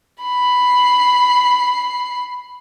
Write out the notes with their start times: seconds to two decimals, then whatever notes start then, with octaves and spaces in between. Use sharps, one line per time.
0.24 B5 C7